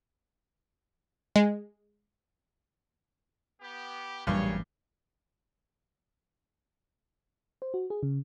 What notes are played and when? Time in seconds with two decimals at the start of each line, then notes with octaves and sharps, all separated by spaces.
1.36 G#3
3.61 B3 G4
4.27 A1 G2 A#2 F#3 G3 A#3 G#4 C#5
7.62 C5
7.74 F#4
7.90 G#4
8.03 C#3